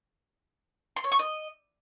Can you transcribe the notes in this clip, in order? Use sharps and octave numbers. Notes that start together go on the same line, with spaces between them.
C6
C#5
C#6
D#5